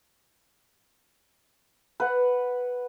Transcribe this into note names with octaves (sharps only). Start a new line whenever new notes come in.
B4 F#5